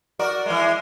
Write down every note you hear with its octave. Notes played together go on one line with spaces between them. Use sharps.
F#4 A#4 D5
E3 G#3